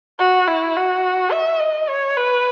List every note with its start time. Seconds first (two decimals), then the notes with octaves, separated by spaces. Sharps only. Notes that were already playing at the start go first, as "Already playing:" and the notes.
0.19 F#4
0.48 E4
0.77 F#4
1.32 E5
1.60 D#5
1.89 C#5
2.17 B4